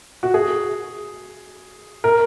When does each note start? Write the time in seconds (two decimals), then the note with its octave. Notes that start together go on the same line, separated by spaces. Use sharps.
0.23 F#4
0.34 G#4
2.04 A#4